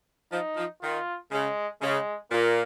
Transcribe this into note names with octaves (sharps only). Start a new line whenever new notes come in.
F3 D#4
F3
D#3 F4
C#3 G#3
C#3 G#3
A#2 A#3